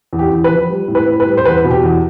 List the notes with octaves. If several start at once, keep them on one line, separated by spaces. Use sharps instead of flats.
E2
G4
E2
B4
F3
G3
A2
B4
A2
B4
G3
C5
E2 B4
B2
G4
E2